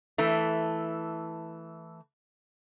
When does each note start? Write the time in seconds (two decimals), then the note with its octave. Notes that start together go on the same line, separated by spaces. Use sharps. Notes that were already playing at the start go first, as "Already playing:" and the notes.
0.18 E3 A3